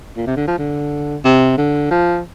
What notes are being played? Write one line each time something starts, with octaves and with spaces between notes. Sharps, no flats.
A#2
C3
D3
F3
D3
C3
D3
F3